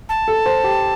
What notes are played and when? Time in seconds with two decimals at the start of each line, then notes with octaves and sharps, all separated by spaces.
0.09 A5
0.28 A4
0.46 C5
0.64 G4